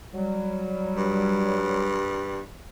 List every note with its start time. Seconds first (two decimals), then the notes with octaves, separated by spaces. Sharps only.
0.13 F#3 G3
0.97 G2